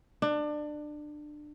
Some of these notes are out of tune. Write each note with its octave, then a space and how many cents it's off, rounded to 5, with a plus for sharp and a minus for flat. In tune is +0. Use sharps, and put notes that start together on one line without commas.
D4 +25